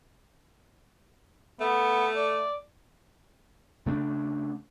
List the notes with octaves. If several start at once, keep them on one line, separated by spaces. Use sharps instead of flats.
A3 B3
D5
C#3 A3 D4